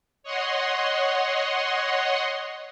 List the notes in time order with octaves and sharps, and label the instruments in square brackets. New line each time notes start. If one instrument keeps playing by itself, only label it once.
[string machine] C#5 D#5 F#5 C6